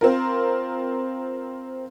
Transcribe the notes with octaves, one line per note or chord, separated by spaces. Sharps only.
C4 F4 A#4